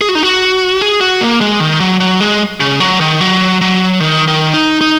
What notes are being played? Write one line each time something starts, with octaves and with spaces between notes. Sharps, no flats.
G#4
F#4
D#4
F#4
G#4
F#4
A#3
G#3
D#3
F#3
F#3
G#3
C#3
F#3
D#3
F#3
F#3
D#3
D#3
D#4
D#4